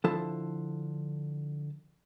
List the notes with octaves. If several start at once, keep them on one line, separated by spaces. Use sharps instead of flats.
D3 F3 E4 A4 C5 A5